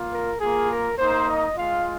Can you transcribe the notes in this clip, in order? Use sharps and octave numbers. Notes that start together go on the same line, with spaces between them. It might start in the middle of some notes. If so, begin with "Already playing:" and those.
Already playing: A#3 F4
A#4
A#3 F4 G#4
A#4
A#3 D#4 C5
D#5
G#3 F4 F5